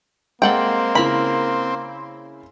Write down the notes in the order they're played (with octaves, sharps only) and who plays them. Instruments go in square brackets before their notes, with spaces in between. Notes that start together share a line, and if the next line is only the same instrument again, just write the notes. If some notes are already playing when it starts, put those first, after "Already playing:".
[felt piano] G#3 [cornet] A#3 [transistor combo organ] C4 [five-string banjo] A4 F#5 G5
[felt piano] C#3 E4 [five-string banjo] A#4 B5